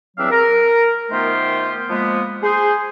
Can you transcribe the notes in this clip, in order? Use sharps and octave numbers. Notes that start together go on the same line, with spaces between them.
E2 F#3 C4 D4 E5 F5
A#4
D#3 A3 B3 F4 G4 C5
F3 G#3 A#3 B3
G#4 C5